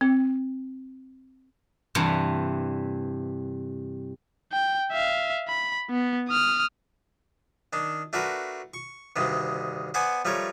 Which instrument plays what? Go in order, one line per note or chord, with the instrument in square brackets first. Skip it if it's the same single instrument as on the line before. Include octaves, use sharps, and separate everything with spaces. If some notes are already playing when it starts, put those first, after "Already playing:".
[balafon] C4
[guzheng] G2 C3 E3
[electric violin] G5
E5 F5
B5
B3
D#6 F6
[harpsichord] D#3 D4
A3 D4 F#4 A#4 B4
C#6
D2 G2 C3 D#3
B3 C5 D5 F#5 G#5
F3 G3 A3 A#4 C#5